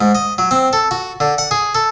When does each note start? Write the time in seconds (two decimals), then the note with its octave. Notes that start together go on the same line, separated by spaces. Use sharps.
0.01 G#2
0.15 D#5
0.38 F#3
0.51 C4
0.73 A4
0.91 F#4
1.20 D3
1.38 F#5
1.51 G#4
1.75 A4